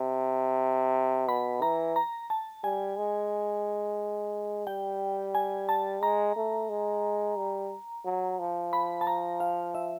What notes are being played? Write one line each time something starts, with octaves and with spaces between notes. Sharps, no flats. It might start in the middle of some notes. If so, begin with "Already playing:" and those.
Already playing: C3
B2 B5
E3 A#5
A#5
A5
G3 G#5
G#3
G3 G5
G#5
A5
G#3 A#5
A3
G#3
G3
F#3
F3
B5
A5
A#5
F5
E5